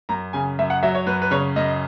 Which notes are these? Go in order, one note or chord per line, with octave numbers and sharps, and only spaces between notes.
F#2 A#5
C#3 G#5
F#2 E5
F#5
F#3 E5
C#5
F#2 B4
B4
C#3 C#5
F#2 D#5